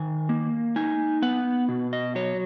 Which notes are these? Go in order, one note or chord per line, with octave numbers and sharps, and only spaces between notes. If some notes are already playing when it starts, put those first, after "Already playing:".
Already playing: D#3 G#5
A#3
D#4 G#5
B3 F#5
B2
D#5
F#3 C#5